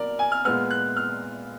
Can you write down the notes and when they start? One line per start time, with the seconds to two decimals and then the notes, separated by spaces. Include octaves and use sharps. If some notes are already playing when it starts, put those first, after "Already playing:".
Already playing: B2 F#3 A#3 A#4 D5
0.19 G#5
0.32 F6
0.45 A#2 G#3 B3 F6
0.71 F#6
0.97 F6